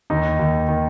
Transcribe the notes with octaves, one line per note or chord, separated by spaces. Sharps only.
D#2 D#4
D#2
D#3